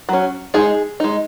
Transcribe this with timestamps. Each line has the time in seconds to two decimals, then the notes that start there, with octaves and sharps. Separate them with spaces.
0.09 F#3 C#4
0.54 G#3 D#4 G#4
1.00 G#3 D#4